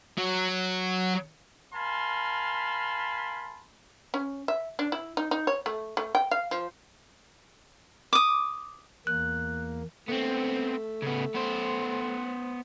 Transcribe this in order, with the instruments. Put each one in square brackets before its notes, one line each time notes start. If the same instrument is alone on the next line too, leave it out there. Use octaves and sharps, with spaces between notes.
[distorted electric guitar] F#3
[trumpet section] A#4 F5 G#5 A5 B5 C6
[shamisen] C#4
E5
D4
E4
D#4
D#4
C#5
A3
A3
G5
F5
F3
[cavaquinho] D6 D#6
[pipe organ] E2 A#3 [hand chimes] F#6
[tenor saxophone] A3 [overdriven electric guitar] B3 C4
[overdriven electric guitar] C#3 B3
B3 C5